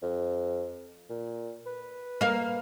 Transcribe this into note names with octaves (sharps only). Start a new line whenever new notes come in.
F2
A#2
B4
A#3 F5